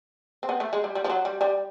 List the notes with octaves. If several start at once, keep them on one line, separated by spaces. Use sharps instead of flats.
C4
B3
A3
G#3
G3
G3
F3
F#3
G3
G3